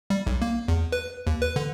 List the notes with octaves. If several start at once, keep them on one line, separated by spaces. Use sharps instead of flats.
G3
B1
A#3
E2
B4
D#2
B4
D3